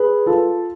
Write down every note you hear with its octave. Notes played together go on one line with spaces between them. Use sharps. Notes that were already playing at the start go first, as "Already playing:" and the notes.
Already playing: G#4 B4
F4 A4